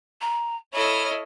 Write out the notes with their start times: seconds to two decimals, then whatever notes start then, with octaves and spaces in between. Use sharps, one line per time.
0.22 A#5
0.74 E4 A4 C#5 D#5 B5 F6